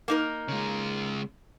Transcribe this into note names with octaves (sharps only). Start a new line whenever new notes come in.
A#3 D#4 A#4
C#3 G#3